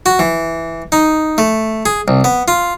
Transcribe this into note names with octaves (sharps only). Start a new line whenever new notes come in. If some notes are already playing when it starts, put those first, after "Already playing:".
F#4
E3
D#4
A3
G#4
C2
B3
F4